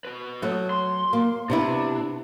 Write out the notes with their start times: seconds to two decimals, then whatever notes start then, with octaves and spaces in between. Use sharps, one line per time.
0.05 F#4 B4
0.42 F#3 A3
0.70 C6
1.13 A#3
1.50 C3 B3 D4 E4